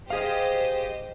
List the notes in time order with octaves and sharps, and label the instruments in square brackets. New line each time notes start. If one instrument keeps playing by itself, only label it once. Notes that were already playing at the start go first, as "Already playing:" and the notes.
[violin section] G4 C5 D#5 [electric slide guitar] G#4 F5